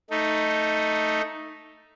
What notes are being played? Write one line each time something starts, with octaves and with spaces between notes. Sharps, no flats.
A3 D#4